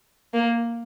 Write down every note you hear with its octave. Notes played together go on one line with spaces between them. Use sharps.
A#3